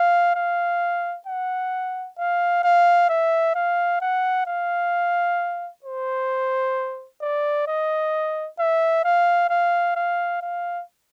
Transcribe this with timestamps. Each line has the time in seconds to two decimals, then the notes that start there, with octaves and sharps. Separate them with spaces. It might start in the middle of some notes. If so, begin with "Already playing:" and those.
Already playing: F5
0.35 F5
1.27 F#5
2.18 F5
2.64 F5
3.09 E5
3.55 F5
4.01 F#5
4.47 F5
5.84 C5
7.21 D5
7.67 D#5
8.59 E5
9.04 F5
9.50 F5
9.96 F5
10.42 F5